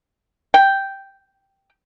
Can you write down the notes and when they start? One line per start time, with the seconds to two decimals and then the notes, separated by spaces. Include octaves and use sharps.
0.54 G5